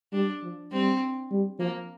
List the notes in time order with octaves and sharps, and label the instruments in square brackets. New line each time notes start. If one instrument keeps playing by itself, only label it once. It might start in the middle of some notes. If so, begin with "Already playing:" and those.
[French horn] G3 [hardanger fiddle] D4
[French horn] F3
[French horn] G3 [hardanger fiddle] C4
[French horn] G3
[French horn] F3 [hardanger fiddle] A#3